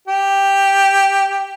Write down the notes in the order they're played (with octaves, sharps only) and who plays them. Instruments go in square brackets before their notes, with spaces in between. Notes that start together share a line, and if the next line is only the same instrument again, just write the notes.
[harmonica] G4